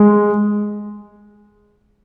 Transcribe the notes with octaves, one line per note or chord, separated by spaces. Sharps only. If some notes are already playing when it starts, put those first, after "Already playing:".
Already playing: G#3